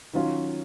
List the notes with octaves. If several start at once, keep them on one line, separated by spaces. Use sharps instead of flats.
D#3 F#3 C#4 F4